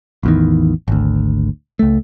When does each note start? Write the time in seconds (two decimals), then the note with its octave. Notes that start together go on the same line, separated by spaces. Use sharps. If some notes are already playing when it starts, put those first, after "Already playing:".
0.23 A1 E2 D#3
0.88 G#1 D2
1.79 C#2 A3